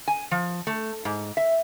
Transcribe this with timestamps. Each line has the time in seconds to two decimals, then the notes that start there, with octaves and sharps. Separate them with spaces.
0.08 G#5
0.31 F3
0.67 A3
1.05 G#2
1.37 E5